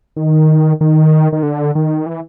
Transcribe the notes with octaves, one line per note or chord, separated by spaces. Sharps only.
D#3
D#3
D#3
D3
D#3
E3